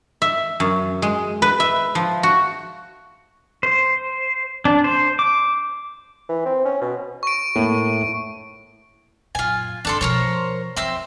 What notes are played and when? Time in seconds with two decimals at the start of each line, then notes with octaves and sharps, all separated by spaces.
0.22 E5
0.60 F#2
1.02 G#3
1.42 B4
1.60 E5
1.95 F3
2.23 F#4
3.63 C5
4.65 D4
4.84 C5
5.19 D6
6.29 E3
6.46 C4
6.65 C#4
6.82 B2
7.23 C#6 D7
7.56 A2 A#3
9.35 F#2 A#2 F4 G#5
9.85 G2 D3 D4 A4 C6
10.01 B2 F3 A#4 C5 C#5
10.77 F2 C4 E5 C6